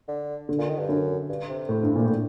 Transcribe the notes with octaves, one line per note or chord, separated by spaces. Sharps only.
D3
D3
A#2
D#3
G2
F#2 D3
G2
C3
A2
G2
A#2
A2